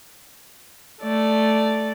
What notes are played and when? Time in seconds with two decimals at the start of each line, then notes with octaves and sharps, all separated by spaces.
1.02 A3 D5